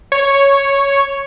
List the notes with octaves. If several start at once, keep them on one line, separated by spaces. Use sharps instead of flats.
C#5